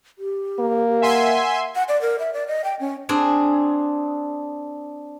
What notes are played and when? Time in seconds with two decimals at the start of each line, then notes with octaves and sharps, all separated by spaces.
0.19 G4
0.59 A#3
1.02 E5 F#5 G#5 C6
1.75 F#5
1.88 D5
2.02 A#4
2.19 E5
2.33 D5
2.47 D#5
2.64 G5
2.80 C#4
3.09 C4 D4 G#4